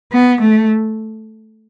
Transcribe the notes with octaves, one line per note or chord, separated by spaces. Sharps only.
B3
A3